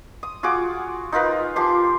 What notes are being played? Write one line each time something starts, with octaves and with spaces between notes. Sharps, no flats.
D#6
F4 F#4 G#4 D6
D#4 F4 A#4 B4
F3 G4 C6 D6